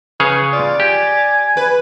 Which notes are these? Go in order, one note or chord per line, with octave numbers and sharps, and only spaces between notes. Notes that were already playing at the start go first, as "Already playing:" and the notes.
C#3 G#4 B4 C#5
F4 D5
G4 G#5
B4